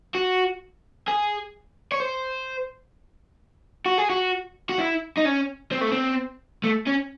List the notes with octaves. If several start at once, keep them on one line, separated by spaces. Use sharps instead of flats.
F#4
G#4
C#5
C5
F#4
G#4
F#4
F#4
E4
D#4
C#4
C4
A3
C4
A3
C#4